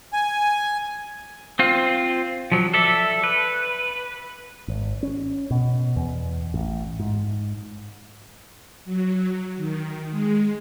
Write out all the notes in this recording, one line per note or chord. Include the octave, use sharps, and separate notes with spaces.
G#5
C4 F4
F3 F#3
A4 D5 E5
B4
G#1
C#4
B2
E2
A1
G#2
F#3
D#3
G#3